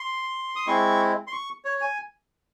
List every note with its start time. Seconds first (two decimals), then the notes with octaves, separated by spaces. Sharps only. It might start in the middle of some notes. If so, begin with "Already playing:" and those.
Already playing: C6
0.56 D#6
0.67 G#3 C4 E4 C#6
1.27 C6
1.32 C#6
1.65 C#5
1.81 G#5